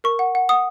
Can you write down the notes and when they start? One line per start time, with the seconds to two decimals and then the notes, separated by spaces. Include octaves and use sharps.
0.04 A#4 C#6
0.19 F#5
0.35 F#5
0.49 F#5 D#6